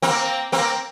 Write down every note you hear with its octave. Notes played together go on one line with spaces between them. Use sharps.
A#3 C4
A#3 C4